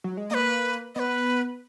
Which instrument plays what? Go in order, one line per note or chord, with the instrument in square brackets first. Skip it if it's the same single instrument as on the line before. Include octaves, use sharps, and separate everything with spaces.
[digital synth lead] F#3
G#3
[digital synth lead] A#3 [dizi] B4 D#5
[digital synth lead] B3 [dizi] B4 D#5